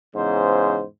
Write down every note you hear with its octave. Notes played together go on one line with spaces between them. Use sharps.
E2 G#2 C#3 C5